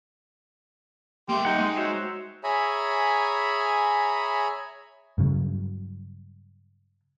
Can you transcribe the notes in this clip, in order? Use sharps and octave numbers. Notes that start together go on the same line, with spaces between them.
A#3 G4 E5 C6
D#4 F#5 G5
G#3
F#4 C5 C#5 E5
G#4 C#5 E5 G#5 A#5 B5
G2 C#3 F#3